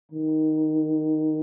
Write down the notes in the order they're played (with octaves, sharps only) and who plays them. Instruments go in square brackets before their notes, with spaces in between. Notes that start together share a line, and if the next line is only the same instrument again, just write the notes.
[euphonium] D#3